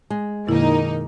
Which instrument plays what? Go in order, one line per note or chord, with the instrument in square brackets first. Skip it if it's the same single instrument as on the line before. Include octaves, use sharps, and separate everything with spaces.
[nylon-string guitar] G#3
[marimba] F#2 B2 E4 [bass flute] D#3 [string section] A#3 D#4